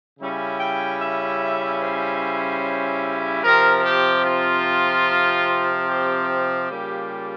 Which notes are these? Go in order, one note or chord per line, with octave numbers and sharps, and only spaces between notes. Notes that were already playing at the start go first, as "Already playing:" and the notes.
C#3 G3 C#4 E4
G5
E5
C5
C3 F3 C4 A#4
G4
F4
G4
G4
C#3 G3 A#3 F4